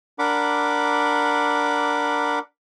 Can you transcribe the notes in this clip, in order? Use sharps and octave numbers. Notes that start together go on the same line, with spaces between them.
D4 A#4 F#5 B5 D6